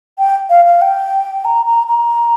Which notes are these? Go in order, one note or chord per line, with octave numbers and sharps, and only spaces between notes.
G5
F5
F5
G5
A#5
A#5
A#5